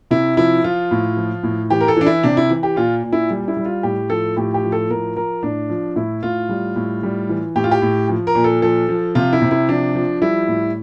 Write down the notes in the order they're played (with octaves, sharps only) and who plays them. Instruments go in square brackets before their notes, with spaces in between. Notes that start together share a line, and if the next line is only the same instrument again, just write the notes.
[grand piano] C3 E4
F3 E4
F3 F4
A2
F3
A2
E3 G4
A#4
A4
E3 D4
E4
C3 D4
E4
E3
G4
A#2 F4
A#2
E4
G3
E4
G3
F4
A2 G4
F3 A4
A2 G4
G4
F3
A4
A2 A#4
F3 A#4
A2 D4
F3
A2 E4
A2 F4
G3
A2
G3
E3
A2 G4
F4
G4
A2
F3
A#4
A#2
A4
F3 A4
F3
C3 F4
E4
C3
E4
F3 D4
F3
G3 E4
A2